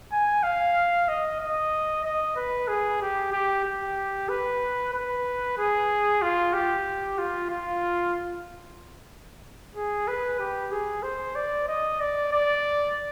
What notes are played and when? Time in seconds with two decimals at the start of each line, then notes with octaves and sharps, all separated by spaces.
0.12 G#5
0.43 F5
1.09 D#5
1.41 D#5
2.05 D#5
2.36 B4
2.68 G#4
3.01 G4
3.33 G4
3.65 G4
4.29 B4
4.93 B4
5.58 G#4
6.22 F4
6.54 G4
7.18 F4
7.50 F4
9.76 G#4
10.08 B4
10.40 G4
10.71 G#4
11.03 C5
11.36 D5
11.68 D#5
12.00 D5
12.32 D5